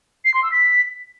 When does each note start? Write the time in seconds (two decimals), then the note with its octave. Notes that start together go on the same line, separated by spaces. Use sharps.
0.25 C7
0.34 C6
0.43 E6
0.52 B6